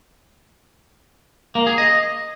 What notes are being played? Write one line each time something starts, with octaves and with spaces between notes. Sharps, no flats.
A#3
G#4
D#5